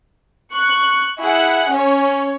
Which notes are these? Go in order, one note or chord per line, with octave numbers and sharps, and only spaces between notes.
C#6 F#6
E4 G#4 F#5
C#4 C#5